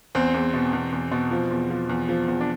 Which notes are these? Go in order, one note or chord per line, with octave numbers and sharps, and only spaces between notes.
E2 C4
E2
B2
E2
E2
B2
F3
E2
F3
E2
F3
E2
D4